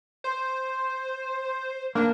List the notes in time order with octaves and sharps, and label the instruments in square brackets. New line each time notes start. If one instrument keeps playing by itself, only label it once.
[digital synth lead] C5 [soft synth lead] C6
[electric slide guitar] A#3 [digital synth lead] D4